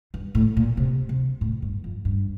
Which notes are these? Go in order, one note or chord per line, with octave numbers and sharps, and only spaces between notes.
G2
A2
A#2
C3
C3
A2
G2
F2
G2